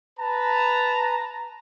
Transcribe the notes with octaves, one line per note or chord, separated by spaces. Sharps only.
B4 A5 A#5